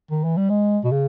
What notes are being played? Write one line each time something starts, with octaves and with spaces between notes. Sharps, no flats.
D#3
E3
G3
G#3
B2
C#3